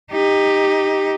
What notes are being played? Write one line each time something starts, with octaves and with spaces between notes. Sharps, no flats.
D#4 G4